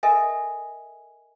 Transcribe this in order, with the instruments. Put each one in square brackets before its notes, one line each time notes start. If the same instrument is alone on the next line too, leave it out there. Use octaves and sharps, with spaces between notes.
[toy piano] A4 A#4 D#5 E5 G#5